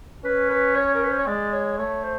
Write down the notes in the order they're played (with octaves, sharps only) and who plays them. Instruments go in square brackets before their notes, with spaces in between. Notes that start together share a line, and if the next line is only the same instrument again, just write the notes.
[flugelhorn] C#4 [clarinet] B4
[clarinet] B4
C#5
A#4
B4
C5
C#5
[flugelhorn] G#3 [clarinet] D5
[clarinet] C#5
[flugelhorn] A3 [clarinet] C#5
[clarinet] C5